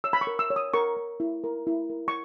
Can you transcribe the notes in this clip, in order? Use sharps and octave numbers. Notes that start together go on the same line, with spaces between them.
C#5 E6
B5
C#6
A#4
E6
C#5
D#6
A#4 C#6
A#4
E4
A#4
E4
A#4
C#6